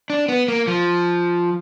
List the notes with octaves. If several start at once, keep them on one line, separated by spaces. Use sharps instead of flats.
D4
B3
A#3
F3